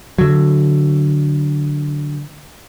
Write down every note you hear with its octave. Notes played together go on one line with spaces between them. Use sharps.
D3 F#3